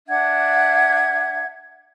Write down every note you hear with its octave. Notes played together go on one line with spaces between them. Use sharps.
D4 E5 F#5 G#6